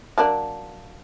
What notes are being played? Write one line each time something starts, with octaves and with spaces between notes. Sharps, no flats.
F#3 A#3 D4